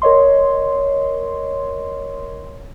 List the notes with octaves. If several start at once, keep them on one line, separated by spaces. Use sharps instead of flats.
A#4 C#5 D#5 C6